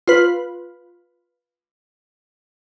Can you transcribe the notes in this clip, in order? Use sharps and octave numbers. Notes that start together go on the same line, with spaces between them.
F4 B4